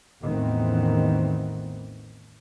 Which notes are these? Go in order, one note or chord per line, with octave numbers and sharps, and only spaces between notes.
A1 E2 D#3 E3 B3 C4